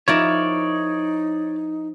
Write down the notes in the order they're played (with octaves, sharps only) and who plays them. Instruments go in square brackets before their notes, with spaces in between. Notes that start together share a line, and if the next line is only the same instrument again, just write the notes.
[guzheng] F3 E4 A#4 [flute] D#4 [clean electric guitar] C#5 D5